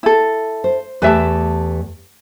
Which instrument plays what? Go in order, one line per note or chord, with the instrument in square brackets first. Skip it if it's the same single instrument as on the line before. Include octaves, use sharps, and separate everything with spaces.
[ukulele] E4 A4
[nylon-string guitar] C5
[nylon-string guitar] E2 A3 G4 [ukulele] B4 E5 A5